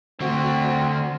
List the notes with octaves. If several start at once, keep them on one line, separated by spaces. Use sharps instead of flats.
D3 C4 F#4